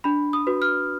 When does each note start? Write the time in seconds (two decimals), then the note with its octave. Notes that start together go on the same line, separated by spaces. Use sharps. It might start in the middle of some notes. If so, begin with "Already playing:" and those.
0.04 D4 B5
0.33 D#6
0.47 F#4 B4
0.62 F6